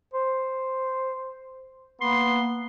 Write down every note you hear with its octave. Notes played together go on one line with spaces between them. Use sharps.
C5
A#3 B3 C6